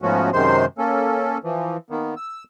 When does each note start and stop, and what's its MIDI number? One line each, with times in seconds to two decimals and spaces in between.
0.02 0.30 44
0.02 0.30 53
0.02 0.30 57
0.02 0.30 59
0.02 0.30 61
0.02 0.30 66
0.33 0.65 42
0.33 0.65 48
0.33 0.65 51
0.33 0.65 56
0.33 0.65 72
0.33 0.65 84
0.78 1.38 58
0.78 1.38 61
0.78 1.38 69
1.44 1.77 52
1.44 1.77 53
1.90 2.14 51
1.90 2.14 58
1.90 2.14 59
2.17 2.44 88